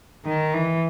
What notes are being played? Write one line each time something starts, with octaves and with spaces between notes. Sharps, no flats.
D#3
E3